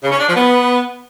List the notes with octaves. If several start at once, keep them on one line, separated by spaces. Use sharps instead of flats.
C#3
C#4
D4
F3
B3